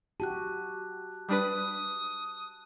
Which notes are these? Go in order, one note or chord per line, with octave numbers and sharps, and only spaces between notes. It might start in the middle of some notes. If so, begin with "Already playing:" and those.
F#4 G4 A5 F#6
G3 D4 B4 D#6